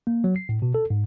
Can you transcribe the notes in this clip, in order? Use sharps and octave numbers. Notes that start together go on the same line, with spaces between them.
A#3
F#3
C7
A2
B2
A4
G#2